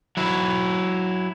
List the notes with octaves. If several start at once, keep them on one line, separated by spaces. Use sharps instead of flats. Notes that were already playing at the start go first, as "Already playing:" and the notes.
F#3 E4